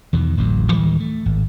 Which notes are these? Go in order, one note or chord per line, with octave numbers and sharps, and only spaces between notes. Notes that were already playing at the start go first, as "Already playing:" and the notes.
E2 B2 D#3
D1 A1 F2 F#3
D1 D#3 G3 G#3
A3
G#1